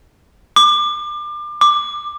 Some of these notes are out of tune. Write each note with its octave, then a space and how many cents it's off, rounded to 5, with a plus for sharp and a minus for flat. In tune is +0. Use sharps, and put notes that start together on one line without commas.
D6 +30
D6 +15